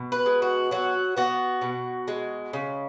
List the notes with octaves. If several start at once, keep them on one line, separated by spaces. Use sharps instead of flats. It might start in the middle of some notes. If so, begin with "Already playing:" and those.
Already playing: B2
B4
G#3
F#4
F#3 F#4
B3 F#4
B2
G#3
C#3